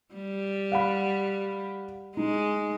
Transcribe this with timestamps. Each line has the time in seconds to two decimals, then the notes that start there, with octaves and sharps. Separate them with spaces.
0.14 G3
0.72 F5 F#5 B5
2.17 G#3 D#4